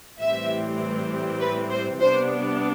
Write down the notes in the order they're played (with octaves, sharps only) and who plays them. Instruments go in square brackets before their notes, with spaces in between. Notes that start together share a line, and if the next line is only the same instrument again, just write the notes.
[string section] A2 E3 G3 C4 E5
B4
C5
C3 G3 B3 D4 C5